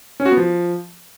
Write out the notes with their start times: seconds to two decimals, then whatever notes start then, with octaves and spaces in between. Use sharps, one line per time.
0.20 C#4
0.26 F#4
0.31 B3
0.37 F3